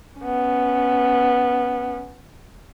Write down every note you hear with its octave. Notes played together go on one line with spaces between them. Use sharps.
B3 C#4